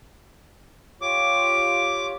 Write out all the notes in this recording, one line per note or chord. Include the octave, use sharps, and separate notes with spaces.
F4 G4 C#5 D6